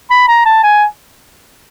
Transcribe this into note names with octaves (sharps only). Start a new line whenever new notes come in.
B5
A#5
A5
G#5